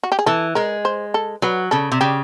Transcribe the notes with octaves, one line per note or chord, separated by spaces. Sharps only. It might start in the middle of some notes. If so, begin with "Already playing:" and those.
F#4
G4
G#4
E3 A4
G#3 A#4
C5
A4
F#3 B4
C#3 A4
C3
C#3 G4